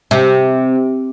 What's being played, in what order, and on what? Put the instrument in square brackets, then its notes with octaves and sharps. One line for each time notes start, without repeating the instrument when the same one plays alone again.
[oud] C3